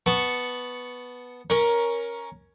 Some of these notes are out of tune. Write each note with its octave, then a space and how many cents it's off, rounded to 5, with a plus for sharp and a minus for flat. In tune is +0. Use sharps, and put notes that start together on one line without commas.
B3 +0 A5 -10 C#6 +0
C#4 +0 A#4 +10